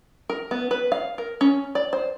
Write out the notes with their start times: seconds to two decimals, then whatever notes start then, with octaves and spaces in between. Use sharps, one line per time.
0.30 A#4
0.51 B3
0.71 B4
0.92 F5
1.18 A#4
1.41 C#4
1.75 D5
1.93 C5